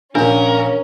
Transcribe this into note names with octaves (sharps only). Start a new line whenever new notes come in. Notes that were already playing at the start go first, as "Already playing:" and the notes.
A#1 A#2 C#4 D4 A#4